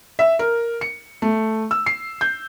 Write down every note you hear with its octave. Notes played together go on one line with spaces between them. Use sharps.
E5
A#4
C#7
A3
E6
C7
G6